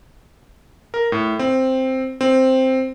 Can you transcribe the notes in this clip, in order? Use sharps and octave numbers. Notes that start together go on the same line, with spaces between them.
A#4
A2
C4
C4